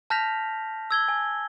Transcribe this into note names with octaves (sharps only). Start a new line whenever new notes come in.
A5 F6 G6 A#6 B6 F7
E6 G#6 G7
G#5